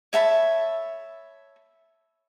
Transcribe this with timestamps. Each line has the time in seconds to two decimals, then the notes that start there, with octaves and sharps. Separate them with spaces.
0.13 C#5 E5 A5 B5